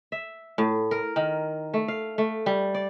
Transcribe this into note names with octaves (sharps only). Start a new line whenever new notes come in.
E5
A2
A#4
D#3
A3
F5
A3
G3
D5